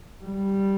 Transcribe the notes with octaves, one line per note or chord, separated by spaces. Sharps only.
G3